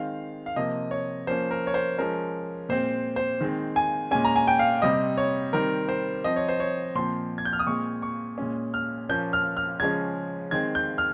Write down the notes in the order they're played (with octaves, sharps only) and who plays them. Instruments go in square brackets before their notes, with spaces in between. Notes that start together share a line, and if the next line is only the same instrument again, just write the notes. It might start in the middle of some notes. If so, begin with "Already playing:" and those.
Already playing: [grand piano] D#3 G#3 C4 F5
F5
C3 F3 A#3 D#5
C#5
F3 A#3 C#4 C5
A#4
C#5
C5
F3 G#3 C#4 A#4
A#2 G#3 C4 C5
C5
D#3 G#3 C4
G#5
A#2 G#3 C#4 G#5
A#5
G#5
G5
F5
C3 G3 C4 D#5
C#5
D#3 G3 C4 A#4
C5
F3 C4 D#5
C#5
C5
C#5
A#2 F3 C4 C6
G#6
G6
F6
D#6
A#2 G#3 C4 C#6
C#6
A#2 G#3 C#4
F6
A#2 F3 A#3 C#4 G6
F6
F6
C#3 F3 G#3 C#4 G#6
D#3 G#3 C4 G#6
G6
F6